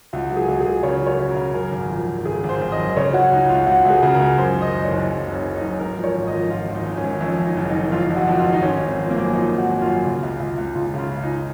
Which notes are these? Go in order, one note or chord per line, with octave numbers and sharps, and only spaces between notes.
C#2 F#4
F#3
G#4
C#2
C#2 G#4
C#3 C#5
F#3
C#5
C#3
A#4
C#3
F#2 A#4
G#1
F3
G#1
G#1 G#4
G#1
C5
G#1
D#5
F#2
C#3 C#5
F#3 F#4
C#2 D#4
C#2 F4
C#2 F#4
C#2
G#4
C#3
A#4
C#2
F#2 C5
D#3
D#5
F#1
C#5
F#1
F#1
F#1
C#4
F#2
D#4
F#2
G#2 A#4
F3
C#5
G#1
D#5
F3
G#1 F4
G#1
D#4
G#2
C#4
G#1
F2 C#4
F2
D#4
F#1
D#4
D#3
F2 F4
F2
F#4
F2
F4
D#3
D#4
G#1 C#4
G#1
C4
F3
A#3
F#2
F3 D#4
G#1
F#4
G#1
F#2 F4
C#3
C#2
C#2
C#2
C#2 F4
C#3
F4
C#2
D#4